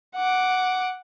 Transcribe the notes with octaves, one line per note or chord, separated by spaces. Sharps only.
F#5 D6